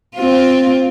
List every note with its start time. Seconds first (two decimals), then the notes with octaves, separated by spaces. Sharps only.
0.16 C4 F4